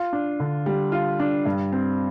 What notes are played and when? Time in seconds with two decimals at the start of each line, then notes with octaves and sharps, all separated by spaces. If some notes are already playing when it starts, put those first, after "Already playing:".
Already playing: F4
0.13 D4
0.40 D3
0.66 G3
0.92 F4
1.20 D4
1.46 G2
1.72 C4